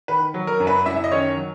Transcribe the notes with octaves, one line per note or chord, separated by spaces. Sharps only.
D#3 B4
F#3
A#4
F#2
B4
F#2 E4 E5
E5
D#5
D#3 C#4 C#5
F#3